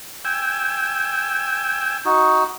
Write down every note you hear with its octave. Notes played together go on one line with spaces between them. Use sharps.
G5 G#5 E6
D#4 F#4